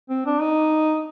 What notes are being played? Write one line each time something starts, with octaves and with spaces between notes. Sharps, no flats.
C4
D4
D#4